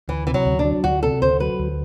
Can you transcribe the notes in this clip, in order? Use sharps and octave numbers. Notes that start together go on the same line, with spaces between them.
D2 E3
C3 E3
F#3
D2
D4
F#3
D2 F#4
C3 A4
D2 C5
F#3 B4
D2